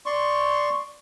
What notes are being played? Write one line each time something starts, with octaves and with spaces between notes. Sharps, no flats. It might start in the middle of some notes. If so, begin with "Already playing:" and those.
D5 C6 C#6